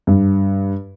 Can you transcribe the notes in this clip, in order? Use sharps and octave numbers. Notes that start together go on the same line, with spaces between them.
G2